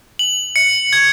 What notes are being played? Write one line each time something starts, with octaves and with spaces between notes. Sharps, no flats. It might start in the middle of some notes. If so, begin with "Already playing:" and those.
F#7
C#7
G#6